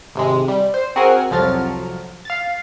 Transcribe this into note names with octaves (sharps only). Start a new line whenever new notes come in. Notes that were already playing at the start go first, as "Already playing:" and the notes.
G#1 C3 G#3
G3
C5
C4 F#4 G#4 A#4 F#5 G#5
C2 F2 F3 F#3 F6 A6
F5 A6